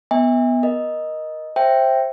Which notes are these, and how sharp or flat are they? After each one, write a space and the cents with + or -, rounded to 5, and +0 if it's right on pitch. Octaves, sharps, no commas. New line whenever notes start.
B3 +0 E5 -30 G#5 -40
A#4 +20 D#5 +0
C5 +15 E5 +10 G5 +0